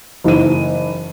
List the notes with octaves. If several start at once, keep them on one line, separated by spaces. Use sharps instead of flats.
F#1 E3 D#4 D#7